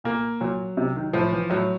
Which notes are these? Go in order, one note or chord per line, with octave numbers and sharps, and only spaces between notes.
A#2 A#3
A#2 F#3
C3
D#3
A2 F3
E3
A2 F#3